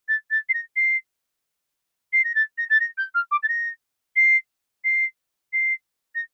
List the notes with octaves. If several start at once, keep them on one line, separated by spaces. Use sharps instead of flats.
A6
A6
C7
A#6
C7
C7
A#6
A6
A#6
A6
A#6
G6
F6
D6
A6
A#6
C7
C7
C7
A#6